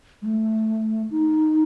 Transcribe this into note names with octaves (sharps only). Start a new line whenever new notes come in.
G#3
A3
D#4